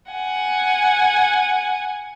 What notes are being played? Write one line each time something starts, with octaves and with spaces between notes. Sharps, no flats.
F#5 G#5